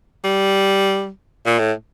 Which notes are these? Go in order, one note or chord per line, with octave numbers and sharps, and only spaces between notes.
G3
A#2
A2